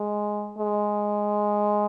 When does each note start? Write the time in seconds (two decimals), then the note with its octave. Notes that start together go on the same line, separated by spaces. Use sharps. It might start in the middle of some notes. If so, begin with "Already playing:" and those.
Already playing: G#3
0.58 G#3